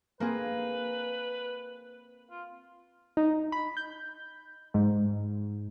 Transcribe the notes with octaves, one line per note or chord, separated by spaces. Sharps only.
A#3 C4 G#4 B4
F4
D#4
B5
G6
G#2